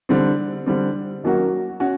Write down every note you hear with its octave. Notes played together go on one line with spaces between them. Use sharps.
D3 G3 C4
D3 G3 C4
D#3 F#3 A#3 C#4 F#4
C#4 F#4